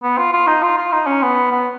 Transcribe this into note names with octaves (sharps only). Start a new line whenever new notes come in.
B3
F4
F4
D#4
F4
F4
D#4
C#4
B3
B3